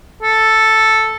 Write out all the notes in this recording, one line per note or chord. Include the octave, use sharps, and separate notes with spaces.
A4